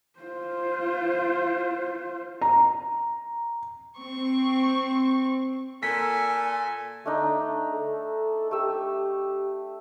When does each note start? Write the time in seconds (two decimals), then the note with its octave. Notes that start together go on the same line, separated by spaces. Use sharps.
0.20 F4 C5
2.41 A#5
3.99 C4 C#6
5.83 A#2 A4 G#5 B6
7.06 D3 A3 D4 D#4
7.69 A4
8.51 A3 G4 E6